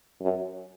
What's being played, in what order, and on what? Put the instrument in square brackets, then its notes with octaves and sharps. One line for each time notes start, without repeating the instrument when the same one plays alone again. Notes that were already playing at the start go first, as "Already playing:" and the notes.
[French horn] F#2